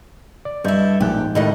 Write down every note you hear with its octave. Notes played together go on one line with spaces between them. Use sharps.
D5
G2 A3 E4 D#5 G6
A#1 G#2 G4 G5 F#6
G#2
A2 D#3 G3 A3 D#5 F#5